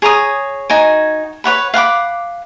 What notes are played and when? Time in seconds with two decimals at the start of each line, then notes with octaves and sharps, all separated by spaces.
0.02 G#4 C#5 A#5 D#6
0.70 D#4 F#4 G#5
1.44 B4 C#5 F#5 B5
1.74 F5 F#5 B5 D6